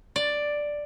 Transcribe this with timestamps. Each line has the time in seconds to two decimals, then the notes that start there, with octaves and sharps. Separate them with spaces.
0.16 D5